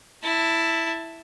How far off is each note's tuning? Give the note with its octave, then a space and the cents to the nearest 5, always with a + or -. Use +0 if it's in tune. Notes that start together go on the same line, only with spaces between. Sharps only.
E4 +0 A5 +15